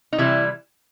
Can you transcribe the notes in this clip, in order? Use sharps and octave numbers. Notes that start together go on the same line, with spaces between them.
D#4
C3 E3 G3 E4